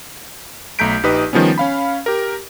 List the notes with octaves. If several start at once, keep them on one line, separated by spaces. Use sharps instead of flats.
B1 A3 A#5 G6 B6 D7
A#1 D#4 G4 B4 D#6
D#3 F3 G3 B3 C#4
C#4 F5 B5
G4 A#4